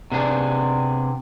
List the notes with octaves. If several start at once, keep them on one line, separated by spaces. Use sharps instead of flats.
C3 B3 D4 G#4